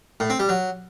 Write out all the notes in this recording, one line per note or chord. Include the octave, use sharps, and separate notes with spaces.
A2
C4
G3
F#3